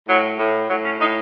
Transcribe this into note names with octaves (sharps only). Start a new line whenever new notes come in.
A2 F#3
A2
A2 F#3
C#4
A2 D#4